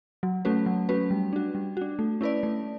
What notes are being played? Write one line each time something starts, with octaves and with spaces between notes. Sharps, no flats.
F#3
A3 C#4 F#4 B4
F#3
A3 C#4 F#4 B4
G3
D4 F#4
G3
D4 F#4
A3
C#4 E4 B4 D5
A3